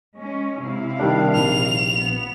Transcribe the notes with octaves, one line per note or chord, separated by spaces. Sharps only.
G#3 C#4
C3 E4 F5
D#3 G3 D4
A#1 F7
B3